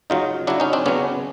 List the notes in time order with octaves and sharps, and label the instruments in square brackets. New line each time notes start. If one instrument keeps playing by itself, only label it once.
[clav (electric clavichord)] C#3 F#3 D#4 F4
C#3 F#3 D4 E4
C#4 D#4
C4 D4
C#3 F#3 B3 C#4